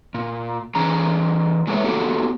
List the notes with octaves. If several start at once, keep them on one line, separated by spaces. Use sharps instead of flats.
A#2
E3 C#4 G#4 A#5
F#3 G#3 A#3 B4 C#5 E5
A#3 B3 F#4 G4 A4